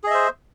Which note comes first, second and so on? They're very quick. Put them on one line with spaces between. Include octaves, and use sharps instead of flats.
G#4 D#5 E5 C5